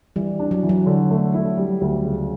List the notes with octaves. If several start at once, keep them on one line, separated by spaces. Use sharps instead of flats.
E3 G3
D4
F#3
E3
F#3
D3
A3
E4
G3
D2
C#3